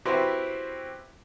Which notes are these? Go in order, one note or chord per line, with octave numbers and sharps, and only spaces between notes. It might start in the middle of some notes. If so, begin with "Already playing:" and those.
C4 E4 F#4 G4 B4 C5